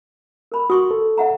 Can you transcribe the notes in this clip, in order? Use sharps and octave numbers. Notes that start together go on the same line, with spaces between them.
A#4 B5
F#4 C6 C#6 D#6
A4
E5 F#5 A#5